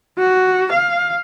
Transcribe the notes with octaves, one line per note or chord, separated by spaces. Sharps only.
F#4
F5